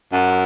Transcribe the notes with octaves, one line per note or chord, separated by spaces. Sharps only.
F#2